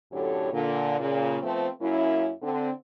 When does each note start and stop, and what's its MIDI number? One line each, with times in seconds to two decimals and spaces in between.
0.12 0.52 42
0.12 0.52 45
0.12 0.52 50
0.12 0.52 67
0.12 0.52 69
0.12 0.52 73
0.53 0.98 46
0.53 0.98 50
1.00 1.38 46
1.00 1.38 49
1.43 1.67 53
1.43 1.67 57
1.43 1.67 59
1.43 1.67 60
1.81 2.31 42
1.81 2.31 58
1.81 2.31 61
1.81 2.31 64
2.42 2.70 50
2.42 2.70 60